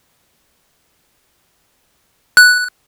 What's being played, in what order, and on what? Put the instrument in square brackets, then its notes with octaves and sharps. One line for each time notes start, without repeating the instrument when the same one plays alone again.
[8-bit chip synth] F#6